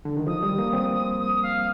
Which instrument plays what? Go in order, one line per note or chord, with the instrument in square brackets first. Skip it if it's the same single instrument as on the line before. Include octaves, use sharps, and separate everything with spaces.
[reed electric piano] D3
D#3
[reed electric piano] F3 [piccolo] D#6
[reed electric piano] G3
A#3
C4
[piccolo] D#6
F5